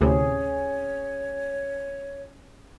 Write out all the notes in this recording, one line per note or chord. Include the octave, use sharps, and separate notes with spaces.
D2 A2 C3 C#4 G#4 C#5